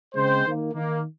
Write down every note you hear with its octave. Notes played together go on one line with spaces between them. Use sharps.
C#3 G#3 C4 C5
D#3 A#3
D#3 A#3